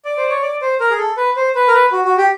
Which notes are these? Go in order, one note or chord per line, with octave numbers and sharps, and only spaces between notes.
D5
C5
C#5
D5
C5
A#4
G#4
A4
B4
C5
B4
A#4
B4
F#4
F#4
G4